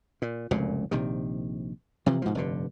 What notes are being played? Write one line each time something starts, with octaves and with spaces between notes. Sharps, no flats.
A#2
F1 C#2 F#2 A#2
A#1 C3 D#3
C3 E3 F3
G#2 B2 F3
F1 G2 D3